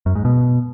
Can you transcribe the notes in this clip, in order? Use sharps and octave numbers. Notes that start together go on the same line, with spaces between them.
F#2
G#2
B2